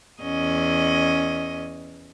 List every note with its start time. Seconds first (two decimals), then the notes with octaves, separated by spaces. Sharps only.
0.22 E2 C#4 D#5